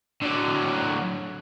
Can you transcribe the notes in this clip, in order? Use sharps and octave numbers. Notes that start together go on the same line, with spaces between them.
D3 F#3